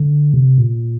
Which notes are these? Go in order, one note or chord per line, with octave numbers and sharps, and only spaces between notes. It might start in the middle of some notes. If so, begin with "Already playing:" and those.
Already playing: D3
C3
A#2